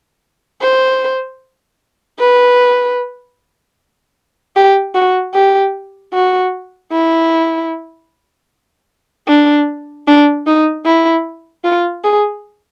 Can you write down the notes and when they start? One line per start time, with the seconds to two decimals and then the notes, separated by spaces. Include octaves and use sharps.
0.62 C5
2.20 B4
4.56 G4
4.95 F#4
5.34 G4
6.14 F#4
6.92 E4
9.28 D4
10.07 D4
10.47 D#4
10.85 E4
11.64 F4
12.04 G#4